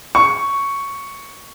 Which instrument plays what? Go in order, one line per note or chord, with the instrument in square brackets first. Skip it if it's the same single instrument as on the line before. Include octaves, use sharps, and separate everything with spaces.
[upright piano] C#6